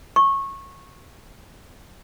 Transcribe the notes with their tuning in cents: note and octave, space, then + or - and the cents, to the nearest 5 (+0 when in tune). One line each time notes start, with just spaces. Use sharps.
C#6 -20